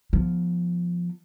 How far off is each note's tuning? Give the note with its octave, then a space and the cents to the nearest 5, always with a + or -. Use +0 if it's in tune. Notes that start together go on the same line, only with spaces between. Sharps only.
F3 +0 B3 -15